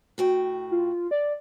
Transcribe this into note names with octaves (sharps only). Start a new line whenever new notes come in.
A2 F#4 G5
F4
D5